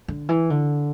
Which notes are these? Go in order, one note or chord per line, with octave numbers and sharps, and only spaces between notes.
D3
E3
D3